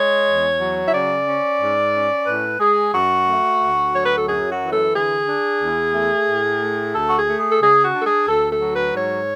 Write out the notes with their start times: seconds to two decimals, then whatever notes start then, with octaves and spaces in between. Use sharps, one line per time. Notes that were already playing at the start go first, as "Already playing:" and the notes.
Already playing: G#3 C#5
0.25 E2
0.59 F#3
0.86 E5
0.92 C#3 D5
1.26 C#4
1.59 G#2
1.93 C#4
2.26 A2 B4
2.59 G#3 G#4
2.93 F#2 F#4
3.26 A3
3.60 D2
3.93 F#3 C#5
4.04 B4
4.15 A4
4.26 F#2 G#4
4.49 F#4
4.60 E3
4.71 A4
4.93 D3 G#4
5.27 D4
5.60 E2
5.94 A3
6.28 A2
6.60 A3
6.94 D2 A4
7.06 F#4
7.17 G#4
7.27 A3
7.38 G#4
7.50 A4
7.60 C#3 G#4
7.83 F#4
7.94 D4
7.99 A4
8.05 G#4
8.28 D2 A4
8.50 A4
8.61 F#3
8.73 B4
8.94 G#2 C#5